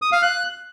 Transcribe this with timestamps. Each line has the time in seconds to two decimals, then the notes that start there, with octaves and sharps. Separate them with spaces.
0.02 D#6
0.12 F5
0.22 F#6